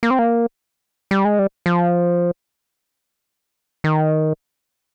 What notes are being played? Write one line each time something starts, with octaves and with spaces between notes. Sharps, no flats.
A#3
C4
A#3
G3
G#3
G3
F3
D#3